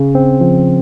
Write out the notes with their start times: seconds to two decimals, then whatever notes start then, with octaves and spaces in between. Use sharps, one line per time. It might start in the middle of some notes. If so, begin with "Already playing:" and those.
Already playing: C#3
0.15 C4
0.41 F3